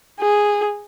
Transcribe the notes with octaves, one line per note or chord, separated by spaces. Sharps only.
G#4